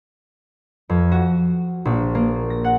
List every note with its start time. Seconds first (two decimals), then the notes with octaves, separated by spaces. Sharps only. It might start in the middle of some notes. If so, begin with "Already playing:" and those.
0.89 F2
1.12 F#4
1.85 A#1
2.15 A#3
2.50 A#6
2.64 F#5